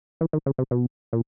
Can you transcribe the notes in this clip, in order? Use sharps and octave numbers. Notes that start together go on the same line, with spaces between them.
E3
D#3
C#3
C3
B2
A#2